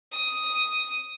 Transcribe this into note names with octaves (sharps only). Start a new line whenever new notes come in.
D#6